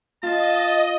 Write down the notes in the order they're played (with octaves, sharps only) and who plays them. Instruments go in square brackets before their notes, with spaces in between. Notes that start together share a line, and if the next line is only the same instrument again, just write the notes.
[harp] F4 [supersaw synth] D#5 [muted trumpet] A5